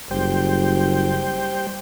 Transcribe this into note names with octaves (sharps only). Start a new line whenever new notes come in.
F#1 G3 C5 G5